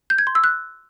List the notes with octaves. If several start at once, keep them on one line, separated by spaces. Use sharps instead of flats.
G6
G#6
C6
E6
F#6